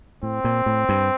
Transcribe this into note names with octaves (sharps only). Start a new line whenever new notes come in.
A2 C4
A#2
A2
G2